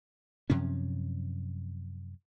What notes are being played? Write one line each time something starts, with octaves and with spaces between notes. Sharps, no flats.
F#2 C3 F3 C#4